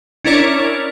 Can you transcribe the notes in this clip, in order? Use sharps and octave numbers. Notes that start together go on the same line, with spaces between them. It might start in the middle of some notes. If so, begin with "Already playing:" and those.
C#4 D4 E4 A#4 C#5 D5